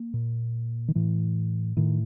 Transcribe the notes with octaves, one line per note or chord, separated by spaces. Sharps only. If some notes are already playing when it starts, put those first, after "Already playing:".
Already playing: A#3
A#2
D#3
A2 E3
A2 D#3